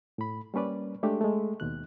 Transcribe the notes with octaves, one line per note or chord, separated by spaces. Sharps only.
A2 B5
G3 A#3 C#4 B4 D5
G#3 A3 D4 G4
G#3 A3
D#2 B2 F#6